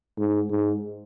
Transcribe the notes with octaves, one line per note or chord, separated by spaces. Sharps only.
G#2
G#2